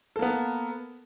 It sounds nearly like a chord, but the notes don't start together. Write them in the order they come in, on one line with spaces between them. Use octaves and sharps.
A4 A#3 B3